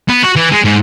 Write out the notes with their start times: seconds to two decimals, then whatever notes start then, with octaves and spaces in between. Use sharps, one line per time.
0.09 B3
0.23 F#4
0.36 E3
0.51 G#3
0.64 G#2